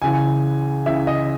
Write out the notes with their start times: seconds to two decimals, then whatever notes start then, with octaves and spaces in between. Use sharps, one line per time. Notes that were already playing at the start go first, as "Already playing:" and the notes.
0.01 C#2 C#3 E3 G#5
0.86 C#2 C#3 E3 E5
1.07 D#5